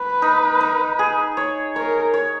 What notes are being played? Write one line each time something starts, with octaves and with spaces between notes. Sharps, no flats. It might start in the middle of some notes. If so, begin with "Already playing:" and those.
Already playing: B4
D#4
D#4
G#4
C#5
A#4 C#5
C#5